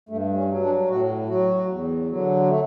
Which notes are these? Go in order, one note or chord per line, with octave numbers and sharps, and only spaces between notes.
G2 A3
C#4
F#3
D4
A2 F#4
F#3 F#4
E2
D3 F#3
A3